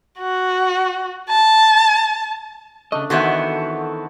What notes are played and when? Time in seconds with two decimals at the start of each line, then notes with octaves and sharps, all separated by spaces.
0.19 F#4
1.29 A5
2.92 C#3 A3 D4 D#5
3.10 D#3 E3 B3 F#4 A4 C5 E5 F#5